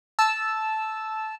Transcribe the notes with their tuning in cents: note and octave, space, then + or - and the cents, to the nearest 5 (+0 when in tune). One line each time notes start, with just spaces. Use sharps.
A5 -10 E6 +0